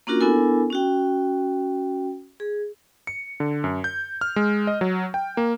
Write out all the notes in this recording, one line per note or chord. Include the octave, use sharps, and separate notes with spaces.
A#3 C#4 D4 F4 F#4 A#4
B3 D4 E4 A4 A#4 G#5
C#4 F#4 G5
G#4
C#7
D3
F#2
G6
F6
G#3
D#5
F#3
G5
A#3